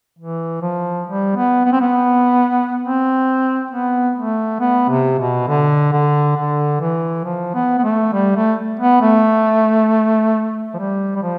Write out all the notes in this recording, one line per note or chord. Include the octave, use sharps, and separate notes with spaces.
E3
F3
G3
B3
B3
C4
B3
C4
B3
A3
B3
C3
B2
D3
D3
D3
E3
F3
B3
B3
A3
G3
A3
B3
A3
F3
G3
G3
F3